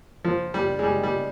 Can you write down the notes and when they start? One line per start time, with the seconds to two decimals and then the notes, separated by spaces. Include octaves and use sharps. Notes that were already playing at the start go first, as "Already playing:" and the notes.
0.25 F3
0.54 G3
0.79 G#3
0.83 G3
1.03 G3